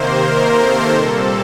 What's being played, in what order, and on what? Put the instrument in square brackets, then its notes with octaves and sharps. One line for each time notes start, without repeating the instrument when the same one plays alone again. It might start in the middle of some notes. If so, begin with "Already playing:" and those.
Already playing: [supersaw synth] C3 D#3 A#3 A#4 C5
A4
A#2 G3 C4 A4